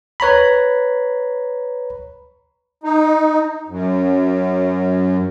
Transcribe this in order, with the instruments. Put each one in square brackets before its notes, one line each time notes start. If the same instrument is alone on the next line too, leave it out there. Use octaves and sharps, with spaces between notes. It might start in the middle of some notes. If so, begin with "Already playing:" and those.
[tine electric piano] B4 C#5 A#5 B5
[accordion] D#4
F#2